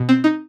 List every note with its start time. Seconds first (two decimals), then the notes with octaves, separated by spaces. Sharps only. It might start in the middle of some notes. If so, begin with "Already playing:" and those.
Already playing: B2
0.09 C4
0.24 D#4